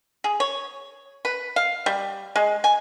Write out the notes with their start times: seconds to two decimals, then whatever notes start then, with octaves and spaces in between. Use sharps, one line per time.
0.24 G#4
0.40 C#5
1.25 B4
1.56 F5
1.86 G3
2.36 G#3
2.64 G#5